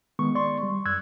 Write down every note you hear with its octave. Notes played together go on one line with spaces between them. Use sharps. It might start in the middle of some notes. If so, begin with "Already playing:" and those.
D#3 G#3 B3 C#6
D5 C6 C#6
G3
F#2 E6 F#6 G#6